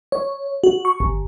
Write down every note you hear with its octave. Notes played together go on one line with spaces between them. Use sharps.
C#5
F#4
C#6
G1